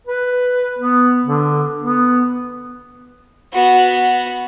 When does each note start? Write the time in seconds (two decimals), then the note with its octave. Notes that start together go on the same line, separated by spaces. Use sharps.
0.07 B4
0.79 B3
1.26 D3
1.81 B3
3.53 B3 F#4